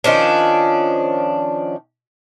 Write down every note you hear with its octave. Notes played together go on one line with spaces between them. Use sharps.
D#3 F3 C#4 D4